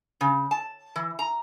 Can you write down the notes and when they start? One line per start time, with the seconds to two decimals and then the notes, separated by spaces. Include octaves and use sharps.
0.21 C#3
0.51 A5
0.96 E3
1.19 A#5